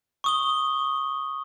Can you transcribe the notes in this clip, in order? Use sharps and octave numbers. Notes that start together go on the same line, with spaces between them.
C#6 D#6 G7